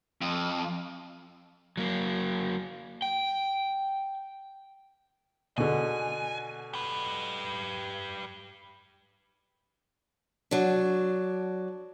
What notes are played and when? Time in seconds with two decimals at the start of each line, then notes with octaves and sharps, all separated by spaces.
0.21 F2
1.77 F#3 A#3
3.02 G5
5.58 B2 D3 G#5
6.73 G4 B4
10.51 F#3 D4